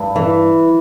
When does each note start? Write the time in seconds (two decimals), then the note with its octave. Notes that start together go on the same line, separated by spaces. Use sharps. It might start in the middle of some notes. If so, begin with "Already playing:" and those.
Already playing: G2
0.16 E3